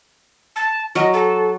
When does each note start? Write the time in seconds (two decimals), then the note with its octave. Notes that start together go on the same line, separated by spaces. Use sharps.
0.56 A5
0.95 F#3 D#5
1.14 A4